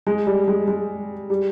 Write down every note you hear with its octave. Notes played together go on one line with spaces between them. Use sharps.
G#3
G3
G#3
G#3
G3